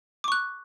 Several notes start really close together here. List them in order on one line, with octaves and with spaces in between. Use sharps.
D6 C#6 F#6